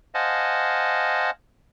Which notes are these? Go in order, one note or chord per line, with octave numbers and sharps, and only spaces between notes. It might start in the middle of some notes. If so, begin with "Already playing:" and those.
C5 D#5 F5 F#5 G#5 A5